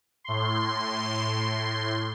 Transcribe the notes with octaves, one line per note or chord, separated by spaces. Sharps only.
A2 C6